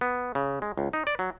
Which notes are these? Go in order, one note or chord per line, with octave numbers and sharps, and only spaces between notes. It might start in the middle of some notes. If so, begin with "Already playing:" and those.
B3
C#3
G#3
C#2
D#4
D5
F#3